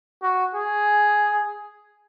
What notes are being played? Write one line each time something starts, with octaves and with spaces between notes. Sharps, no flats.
F#4
G#4